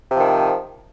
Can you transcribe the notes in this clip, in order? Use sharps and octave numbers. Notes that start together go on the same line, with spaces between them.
C3 D#3 F3